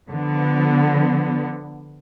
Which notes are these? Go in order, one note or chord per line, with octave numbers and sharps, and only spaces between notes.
D3 F3 B3